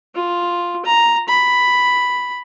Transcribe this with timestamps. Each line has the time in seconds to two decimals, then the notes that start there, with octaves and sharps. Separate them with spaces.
0.15 F4
0.85 A#5
1.28 B5